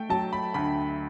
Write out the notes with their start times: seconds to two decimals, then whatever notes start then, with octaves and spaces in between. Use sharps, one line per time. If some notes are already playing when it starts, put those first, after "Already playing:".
Already playing: A3 G5
0.10 F#3 A5
0.33 B5
0.54 D2 B5